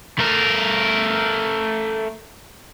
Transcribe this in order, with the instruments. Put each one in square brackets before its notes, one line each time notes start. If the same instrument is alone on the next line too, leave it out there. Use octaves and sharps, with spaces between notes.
[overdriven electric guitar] A3 A#4